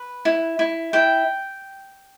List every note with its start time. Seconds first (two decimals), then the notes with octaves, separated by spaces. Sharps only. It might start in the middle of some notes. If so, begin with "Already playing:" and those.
Already playing: B4
0.25 E4
0.59 E4
0.93 E4 G5